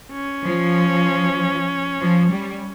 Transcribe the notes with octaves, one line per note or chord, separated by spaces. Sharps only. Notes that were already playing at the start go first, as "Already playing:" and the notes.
C#4
F3
F3
G3